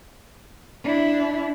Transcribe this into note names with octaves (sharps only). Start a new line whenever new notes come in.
D4 E4